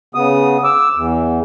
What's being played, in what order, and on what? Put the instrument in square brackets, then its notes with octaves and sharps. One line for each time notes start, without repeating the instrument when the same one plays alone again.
[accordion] C#3 B3 D#6
D6 E6
E2